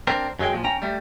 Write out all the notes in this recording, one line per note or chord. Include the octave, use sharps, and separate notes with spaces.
C4 D4 A#4
F#2 F#3 G#3 G5
A#2 F3
C#4 G5 A#5
G3 A3